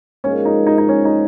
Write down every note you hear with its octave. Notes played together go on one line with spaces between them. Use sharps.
G#2 F3 A#3 C#4
D#4
D#4
D#4
C#4
D#4